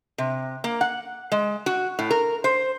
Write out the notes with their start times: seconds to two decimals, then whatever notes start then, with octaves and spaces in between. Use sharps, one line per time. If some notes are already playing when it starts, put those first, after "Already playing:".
0.18 C3
0.64 A#3
0.81 F#5
1.32 G#3
1.66 F#4
1.99 A2
2.10 A#4
2.44 C5